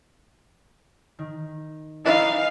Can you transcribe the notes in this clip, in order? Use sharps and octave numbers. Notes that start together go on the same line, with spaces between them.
D#3
D#4 E4 B4 F5 G#5